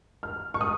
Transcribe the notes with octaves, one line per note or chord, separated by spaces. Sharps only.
F6
C#6
D#6